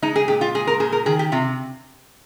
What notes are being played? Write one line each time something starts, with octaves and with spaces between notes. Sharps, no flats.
G#3 D#4
G#4
A#2 G4
F4
G#3 G#4
A#4
A#2 G#4
A#4
D#3 G#4
G4
C3 F4